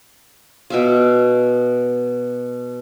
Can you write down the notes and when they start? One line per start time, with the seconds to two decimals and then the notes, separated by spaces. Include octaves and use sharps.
0.70 B2 E5 F5